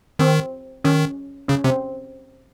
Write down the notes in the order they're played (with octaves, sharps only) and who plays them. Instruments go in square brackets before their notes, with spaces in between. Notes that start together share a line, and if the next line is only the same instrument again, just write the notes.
[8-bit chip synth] D#3 [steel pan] C4
[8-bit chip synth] D#3 [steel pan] C#4
[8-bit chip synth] C#3 [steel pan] C#4
[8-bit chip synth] C3 [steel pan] C4